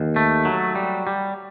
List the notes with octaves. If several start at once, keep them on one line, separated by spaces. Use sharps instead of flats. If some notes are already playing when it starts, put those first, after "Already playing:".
Already playing: D#2
A3
F#3
G3
G3